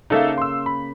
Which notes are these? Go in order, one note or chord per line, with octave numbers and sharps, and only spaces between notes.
C#3 A#3 D#4 A4 E5
C6 E6
B5